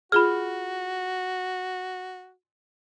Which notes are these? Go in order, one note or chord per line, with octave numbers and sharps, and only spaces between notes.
F4 F#4 G#4 B5 F6